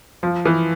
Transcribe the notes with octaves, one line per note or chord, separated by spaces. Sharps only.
F3
E3